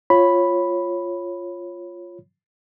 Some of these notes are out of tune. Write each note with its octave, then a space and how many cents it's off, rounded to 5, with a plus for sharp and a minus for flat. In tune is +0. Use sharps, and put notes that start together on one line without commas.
F4 +0 C#5 -15 B5 +0